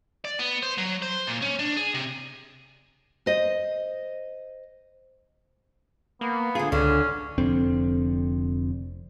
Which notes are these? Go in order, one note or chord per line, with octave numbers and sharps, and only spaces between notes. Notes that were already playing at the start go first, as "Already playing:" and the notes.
D5
B3
C5
F#3
C5
A#2
C#4
D4
G#4
C3
C5 D#5
A#3 B3
D3 F4 G#4
C#2 D3 C#4
F1 F2 D3 C4